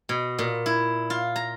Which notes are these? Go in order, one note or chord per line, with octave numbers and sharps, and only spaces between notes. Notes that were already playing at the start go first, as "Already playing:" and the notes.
B2
A#2
E4
F4
A#5